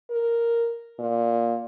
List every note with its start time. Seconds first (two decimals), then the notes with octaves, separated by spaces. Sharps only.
0.11 A#4
0.99 A#2